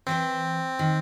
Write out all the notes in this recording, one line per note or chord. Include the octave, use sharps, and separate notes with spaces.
E3 C4 B4 C5
D#3